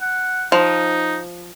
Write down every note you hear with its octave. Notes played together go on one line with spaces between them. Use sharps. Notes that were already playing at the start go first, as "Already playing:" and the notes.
F#5
F3 D#4